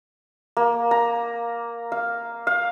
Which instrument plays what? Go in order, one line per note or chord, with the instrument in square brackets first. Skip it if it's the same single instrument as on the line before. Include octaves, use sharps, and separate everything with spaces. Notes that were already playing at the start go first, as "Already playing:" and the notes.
[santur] A#3
A#5
F5
F5